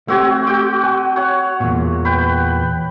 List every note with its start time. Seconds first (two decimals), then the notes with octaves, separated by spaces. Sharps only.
0.08 A3 C4 F#4 G4 G#5
0.47 F#4 G5
0.84 G#5
1.16 C#5 F#5
1.60 E2 A#2
2.05 B4 G5